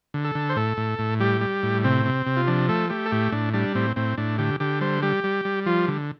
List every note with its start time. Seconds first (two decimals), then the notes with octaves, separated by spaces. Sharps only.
0.14 D3
0.25 A4
0.35 D3
0.49 C5
0.56 A2 A4
0.77 A2
0.99 A2
1.20 G3 G4
1.41 G3
1.63 A2
1.84 C3 C4
2.05 C3
2.26 C3
2.37 F4
2.47 F3 D4
2.69 A3 A4
2.90 A3 G4
3.06 A4
3.11 A2 G4
3.32 A2 D4
3.54 G3 D4
3.75 A2 C4
3.96 A2 C4
4.18 A2 D4
4.38 D3 G4
4.60 D3 G4
4.81 G3 C5
5.02 G3 G4
5.24 G3
5.45 G3
5.66 F3 F4
5.88 D3